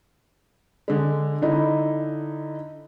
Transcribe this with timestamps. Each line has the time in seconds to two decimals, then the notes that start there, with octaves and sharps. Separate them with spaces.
0.88 D3 G#3
1.42 D3 D#4 E4